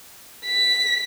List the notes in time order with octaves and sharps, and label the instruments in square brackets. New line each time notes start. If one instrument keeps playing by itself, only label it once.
[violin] B6